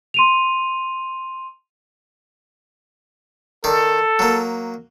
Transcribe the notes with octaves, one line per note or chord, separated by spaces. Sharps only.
C6 D#7 F7
D#3 A4 D5
F#3 A#3